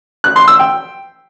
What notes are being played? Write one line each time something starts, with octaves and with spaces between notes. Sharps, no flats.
F#6
C6
E6
G5